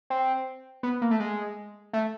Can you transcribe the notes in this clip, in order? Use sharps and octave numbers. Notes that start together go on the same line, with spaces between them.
C4
B3
A#3
A3
G#3
A3